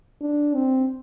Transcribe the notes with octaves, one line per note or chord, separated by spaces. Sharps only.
D4
C4